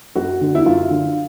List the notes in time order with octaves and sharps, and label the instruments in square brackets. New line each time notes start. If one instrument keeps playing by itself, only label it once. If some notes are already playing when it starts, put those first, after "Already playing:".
[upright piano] F#2 F#4
D3
E4
F#2 F4
D3